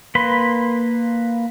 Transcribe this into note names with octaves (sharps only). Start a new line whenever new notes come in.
A#3 B4 B5 C6